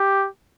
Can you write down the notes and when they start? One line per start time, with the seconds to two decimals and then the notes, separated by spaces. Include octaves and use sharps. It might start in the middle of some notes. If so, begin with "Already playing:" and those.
Already playing: G4